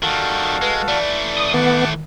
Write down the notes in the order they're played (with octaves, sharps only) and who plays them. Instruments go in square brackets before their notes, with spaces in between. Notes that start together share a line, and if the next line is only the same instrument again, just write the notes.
[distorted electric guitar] D#3 G3 [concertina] F#4 A4 F5
[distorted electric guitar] G#3 [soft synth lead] B4
[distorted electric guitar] E3 A3 [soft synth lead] D5
[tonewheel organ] D#6
[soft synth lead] D#3 [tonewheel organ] B3 [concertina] F#5 A5 D6